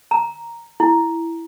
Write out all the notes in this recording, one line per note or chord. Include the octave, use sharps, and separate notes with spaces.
A#5
E4